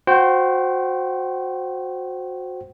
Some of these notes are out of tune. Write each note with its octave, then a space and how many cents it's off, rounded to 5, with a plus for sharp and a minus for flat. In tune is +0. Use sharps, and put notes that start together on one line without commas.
F#4 -20 C5 +0 G5 -35